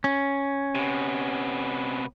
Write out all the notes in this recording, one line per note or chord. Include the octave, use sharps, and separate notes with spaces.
C#4
C3 B3